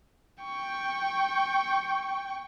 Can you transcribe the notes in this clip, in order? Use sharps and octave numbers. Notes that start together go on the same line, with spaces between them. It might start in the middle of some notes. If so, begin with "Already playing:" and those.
G5 C#6